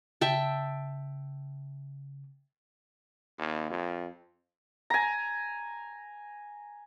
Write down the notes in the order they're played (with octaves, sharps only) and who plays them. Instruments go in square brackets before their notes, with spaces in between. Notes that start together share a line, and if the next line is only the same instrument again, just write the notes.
[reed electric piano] C#3 [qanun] E5 G5 A5
[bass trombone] D#2
F2
[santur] G#5 A#5